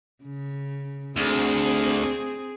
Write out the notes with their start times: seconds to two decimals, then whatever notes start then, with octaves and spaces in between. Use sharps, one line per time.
0.23 C#3
1.16 D2 C4 G#4